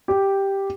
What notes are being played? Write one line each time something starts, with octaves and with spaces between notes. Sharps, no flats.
G4